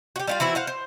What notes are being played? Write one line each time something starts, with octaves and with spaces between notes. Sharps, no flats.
F#4 G4
G3 F4 F5
E3 C4 E4 F#4
C5 F5 F#5
C5